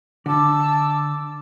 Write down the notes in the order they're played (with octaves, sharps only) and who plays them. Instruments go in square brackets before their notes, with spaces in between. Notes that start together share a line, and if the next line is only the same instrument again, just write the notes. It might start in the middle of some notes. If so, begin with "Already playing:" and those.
[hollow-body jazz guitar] D3 [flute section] A5 D6 E6